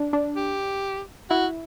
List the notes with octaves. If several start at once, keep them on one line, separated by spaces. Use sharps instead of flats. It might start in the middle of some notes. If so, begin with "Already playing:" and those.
Already playing: D4
D4
G4
E4 F#4